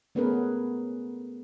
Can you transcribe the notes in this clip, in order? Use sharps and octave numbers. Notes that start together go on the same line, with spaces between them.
A3 B3 C#4 G#4 A#4 B4